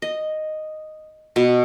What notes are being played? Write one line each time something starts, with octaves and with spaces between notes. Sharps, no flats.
D#5
B2